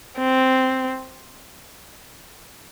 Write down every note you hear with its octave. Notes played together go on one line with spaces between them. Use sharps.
C4